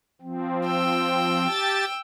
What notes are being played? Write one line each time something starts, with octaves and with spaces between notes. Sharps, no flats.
F3 C4
G5 E6
G4 A5 A6